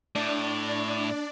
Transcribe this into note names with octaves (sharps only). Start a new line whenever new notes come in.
A2 D4 D5